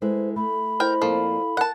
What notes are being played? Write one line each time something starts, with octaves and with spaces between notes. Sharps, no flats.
G#3 E4 A4 B4 C5
A3 B5
E4 A#4 C5 D#5 G5
F2 F3 A#3 E4 A4 D5 F5
A#4 F#5 A5